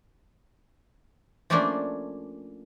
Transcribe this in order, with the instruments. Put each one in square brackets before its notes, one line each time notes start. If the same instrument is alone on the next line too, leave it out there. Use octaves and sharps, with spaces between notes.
[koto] F3 A3 A#3 C#4 D4